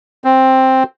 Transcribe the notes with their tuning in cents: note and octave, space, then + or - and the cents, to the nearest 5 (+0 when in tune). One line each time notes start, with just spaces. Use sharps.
C4 +5